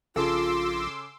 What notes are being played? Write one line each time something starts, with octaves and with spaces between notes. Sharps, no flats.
A#1 C#3 F4 A4 C6 D6 E6